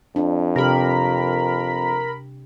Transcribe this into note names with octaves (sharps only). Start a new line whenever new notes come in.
F2 D4
C3 G4 A#4 B5